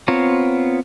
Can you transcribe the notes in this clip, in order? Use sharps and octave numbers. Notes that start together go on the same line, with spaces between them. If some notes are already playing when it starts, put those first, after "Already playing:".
B3 C4 F4 C#5 A#5